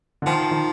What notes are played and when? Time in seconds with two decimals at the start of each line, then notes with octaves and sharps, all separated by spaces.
0.22 D3
0.26 D#3 F3
0.51 D#3